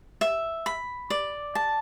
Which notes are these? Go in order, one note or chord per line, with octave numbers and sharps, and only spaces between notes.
E5
B5
D5
A5